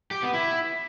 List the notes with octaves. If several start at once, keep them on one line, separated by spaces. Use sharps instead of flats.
G4
B3
E4